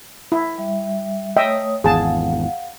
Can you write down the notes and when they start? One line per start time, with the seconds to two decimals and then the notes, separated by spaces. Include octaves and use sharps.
0.32 E4
0.58 G3 E5
1.37 A3 C#5 D#5 E5 G5 D#6
1.84 G#1 E2 G#4 F5 F#5 A5